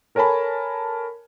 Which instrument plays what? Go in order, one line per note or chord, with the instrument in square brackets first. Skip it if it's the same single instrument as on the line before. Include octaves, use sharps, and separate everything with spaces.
[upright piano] A4 A#4 C#5 G#5 A5 B5